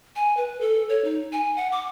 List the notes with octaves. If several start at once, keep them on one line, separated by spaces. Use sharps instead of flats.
G#5
B4
A4
C#5
D#4
G#5
F#5
D6